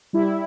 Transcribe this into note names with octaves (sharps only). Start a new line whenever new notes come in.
G3 E4